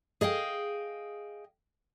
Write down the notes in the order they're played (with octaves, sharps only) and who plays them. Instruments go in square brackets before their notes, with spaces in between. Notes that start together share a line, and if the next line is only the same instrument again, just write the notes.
[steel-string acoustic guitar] G#4 D#5 F5 G5